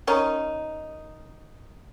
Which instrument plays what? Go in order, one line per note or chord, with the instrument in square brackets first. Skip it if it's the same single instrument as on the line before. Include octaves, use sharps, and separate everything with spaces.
[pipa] D#3 C#4 D#4